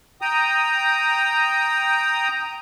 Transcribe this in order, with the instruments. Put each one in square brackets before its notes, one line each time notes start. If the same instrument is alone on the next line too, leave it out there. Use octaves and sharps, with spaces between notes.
[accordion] G5 A#5 D#6